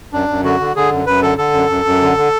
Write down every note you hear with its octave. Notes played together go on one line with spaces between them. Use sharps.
F#2 D4
F#2
D3 F#4
D3
D3 G#4
F#2
F#2 B4
D3 A4
D3 A4
F#2
F#2
F#2
D3
D3